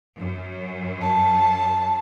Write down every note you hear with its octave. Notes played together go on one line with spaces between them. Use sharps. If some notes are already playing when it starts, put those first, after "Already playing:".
F#2
A5